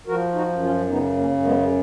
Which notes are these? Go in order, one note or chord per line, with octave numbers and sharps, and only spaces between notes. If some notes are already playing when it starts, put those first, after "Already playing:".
F3 F#4 A#4
D#4 F#4
F#2
C#4 F4
C#3 B3 D#4
A#3 C#4
F#2
G#3 B3